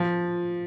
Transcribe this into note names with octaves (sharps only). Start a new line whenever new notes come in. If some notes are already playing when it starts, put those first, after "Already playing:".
Already playing: F3